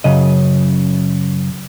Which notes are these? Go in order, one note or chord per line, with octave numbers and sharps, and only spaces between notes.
F#2 C#3 D#5